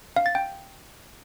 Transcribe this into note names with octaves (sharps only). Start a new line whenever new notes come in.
F5
A6
G5